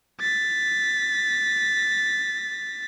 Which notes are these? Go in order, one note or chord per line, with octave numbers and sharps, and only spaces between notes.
A6 B6